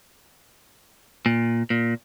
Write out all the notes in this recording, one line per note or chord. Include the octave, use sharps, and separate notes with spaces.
A#2
A#2